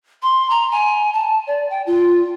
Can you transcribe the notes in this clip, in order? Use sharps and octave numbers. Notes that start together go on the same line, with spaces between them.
C6
A#5
G#5
A5
D5
G5
F4